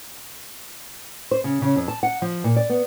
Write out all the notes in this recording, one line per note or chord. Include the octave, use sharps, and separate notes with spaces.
C5
C#3
C#3
F2
A5
F#5
F3
A#2
D5
B3